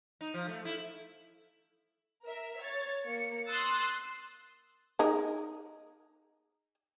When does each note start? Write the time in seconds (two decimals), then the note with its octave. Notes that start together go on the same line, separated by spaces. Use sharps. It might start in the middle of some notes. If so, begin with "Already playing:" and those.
0.21 D#4
0.34 F3
0.48 A3
0.65 E4
2.25 A#4 E5
2.59 C#5 A6
3.06 A#3 C#7
3.48 C6 D#6 E6 F#6 A6
4.99 D#4 G#4 A#4